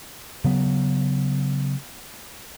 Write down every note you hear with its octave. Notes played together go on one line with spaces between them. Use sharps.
C#3 F#3 B3